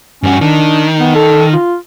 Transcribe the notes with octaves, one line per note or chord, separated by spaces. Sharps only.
G2 C#4 F#4
D#3 D4
B3
A4
F4